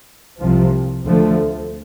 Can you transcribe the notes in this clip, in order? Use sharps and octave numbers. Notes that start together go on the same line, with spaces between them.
C2 C3 F3
D2 D3 F3 A3